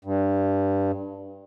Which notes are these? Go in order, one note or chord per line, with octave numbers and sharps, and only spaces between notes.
G2